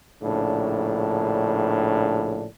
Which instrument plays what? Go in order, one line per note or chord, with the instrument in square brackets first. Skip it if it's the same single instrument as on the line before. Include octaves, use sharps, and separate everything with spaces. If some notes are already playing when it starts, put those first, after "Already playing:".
[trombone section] A#1 A2 C#3 D4